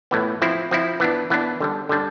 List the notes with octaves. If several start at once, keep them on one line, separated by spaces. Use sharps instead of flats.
A2 E3 B3
F3 C4 E4
F3 C4 E4
E3 B3 D4
E3 B3 D4
D3 G3 D4
D3 G3 D4